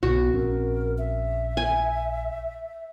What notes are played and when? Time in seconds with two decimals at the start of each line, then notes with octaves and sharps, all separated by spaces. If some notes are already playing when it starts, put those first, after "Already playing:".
0.03 B1 B2 F#4
0.34 A#1 C4 C#4 A#4
0.98 E5
1.57 G#5